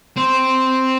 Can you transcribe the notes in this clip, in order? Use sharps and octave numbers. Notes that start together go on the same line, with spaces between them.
C4